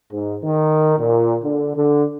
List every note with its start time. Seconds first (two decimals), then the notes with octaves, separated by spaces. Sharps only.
0.13 G#2
0.44 D#3
0.99 A#2
1.44 D3
1.76 D3